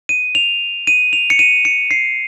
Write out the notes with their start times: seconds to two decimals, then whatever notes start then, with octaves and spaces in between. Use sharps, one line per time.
0.09 D#7
0.35 F7
0.87 D#7
1.13 F7
1.30 C#7
1.39 D#7
1.65 C#7
1.91 C7